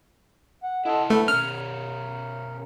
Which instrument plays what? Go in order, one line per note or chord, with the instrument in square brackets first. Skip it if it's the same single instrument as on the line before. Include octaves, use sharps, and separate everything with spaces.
[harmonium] F#5
[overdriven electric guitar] E4 C5 [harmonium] A4 D#5 F#5
[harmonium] D3 A4 B4 [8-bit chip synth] A3
[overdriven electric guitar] B2 C#4 [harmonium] A#4 [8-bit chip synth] F6